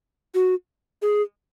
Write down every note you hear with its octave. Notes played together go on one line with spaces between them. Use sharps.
F#4
G#4